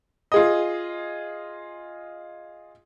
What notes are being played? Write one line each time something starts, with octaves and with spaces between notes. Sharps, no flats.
F4 G#4 D#5